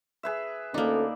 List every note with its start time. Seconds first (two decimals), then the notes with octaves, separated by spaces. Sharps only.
0.23 G#4 B4 E5
0.74 D2 A#3 C#4 D#4 A4 D5